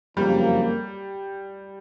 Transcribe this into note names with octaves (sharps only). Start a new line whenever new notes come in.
F#1 F2 C#3 F#3 G3 A#3